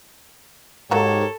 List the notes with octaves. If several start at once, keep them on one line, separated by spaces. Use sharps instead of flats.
G#2 F#3 A#3 G4 A4 A#4 C#5